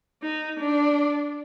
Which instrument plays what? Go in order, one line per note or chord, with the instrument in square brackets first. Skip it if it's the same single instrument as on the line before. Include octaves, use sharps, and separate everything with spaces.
[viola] D#4
D4